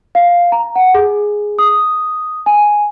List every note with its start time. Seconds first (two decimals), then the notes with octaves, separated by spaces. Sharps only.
0.15 F5
0.52 A#5
0.75 F#5
0.94 G#4
1.59 D#6
2.46 G#5